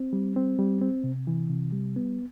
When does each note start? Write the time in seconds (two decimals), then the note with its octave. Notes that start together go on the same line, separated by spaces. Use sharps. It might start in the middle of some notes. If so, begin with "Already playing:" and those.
Already playing: C4
0.13 G3
0.36 C4
0.59 G3
0.81 C4
1.04 C3
1.27 E3
1.50 C3
1.72 G3
1.96 B3